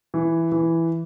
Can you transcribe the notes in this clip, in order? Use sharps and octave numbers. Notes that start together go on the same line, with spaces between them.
E3
E3